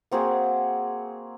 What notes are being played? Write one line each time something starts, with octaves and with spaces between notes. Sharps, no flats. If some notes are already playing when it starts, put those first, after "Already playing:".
A#3 C4 F#4 G#4